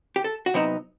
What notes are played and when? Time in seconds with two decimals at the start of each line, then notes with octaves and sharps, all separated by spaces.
0.16 G4
0.24 A4
0.46 F#4
0.54 C3 F#3 B3 D#4 E4